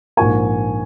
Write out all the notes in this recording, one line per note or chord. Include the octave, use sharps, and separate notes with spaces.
A#1 G#2 F3 A#3 G#5 C#6